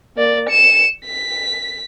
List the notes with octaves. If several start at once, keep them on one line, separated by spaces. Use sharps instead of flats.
A#3 D5
C#7 E7
B6